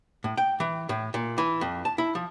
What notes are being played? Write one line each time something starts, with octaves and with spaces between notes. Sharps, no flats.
A2
G5
E3
A2
A#2
E3
F2
A5
E4
F3